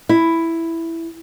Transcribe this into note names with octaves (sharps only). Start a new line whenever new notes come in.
E4